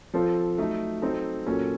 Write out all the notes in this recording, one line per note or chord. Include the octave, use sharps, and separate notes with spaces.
F3 C4 F4 A4 C5
F#3 A3 D#4
F#3 C4 D#4 A4
A#2 F#3 A#3 C#4 A4